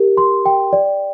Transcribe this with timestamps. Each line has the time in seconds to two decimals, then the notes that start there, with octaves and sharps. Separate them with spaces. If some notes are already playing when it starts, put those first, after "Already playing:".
Already playing: G4 A#4
0.17 C6
0.46 G5
0.73 D5